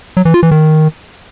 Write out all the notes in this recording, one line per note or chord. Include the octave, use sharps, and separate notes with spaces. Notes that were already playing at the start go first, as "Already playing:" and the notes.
F#3
E3
F4
E3
D#3